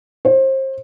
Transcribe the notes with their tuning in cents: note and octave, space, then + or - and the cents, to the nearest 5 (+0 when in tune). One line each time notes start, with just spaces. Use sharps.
C5 +30